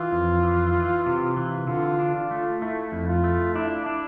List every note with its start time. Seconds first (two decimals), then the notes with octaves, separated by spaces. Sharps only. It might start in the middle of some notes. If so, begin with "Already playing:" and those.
Already playing: E3 F4
0.11 F2
0.43 E3
0.74 E3
1.06 C3
1.37 E3
1.67 D3 F4
1.99 D4
2.15 F4
2.31 A3
2.62 A3 E4
2.92 F2
3.08 F4
3.24 A3
3.55 D4 E4
3.86 D4